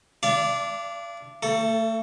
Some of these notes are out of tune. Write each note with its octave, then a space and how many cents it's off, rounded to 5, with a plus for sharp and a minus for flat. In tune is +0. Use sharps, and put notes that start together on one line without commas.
D4 +0 D5 -25 F5 -40
A3 +35 A4 +0